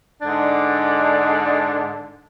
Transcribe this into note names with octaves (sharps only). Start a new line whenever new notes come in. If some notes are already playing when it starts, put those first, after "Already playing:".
G#2 D3 D4